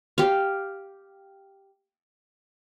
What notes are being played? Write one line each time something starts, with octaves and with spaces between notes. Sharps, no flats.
G4 F5